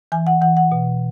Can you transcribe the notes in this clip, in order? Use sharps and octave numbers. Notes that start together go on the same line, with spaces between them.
E3 G#5
F#5
E3 F#5
F#5
B2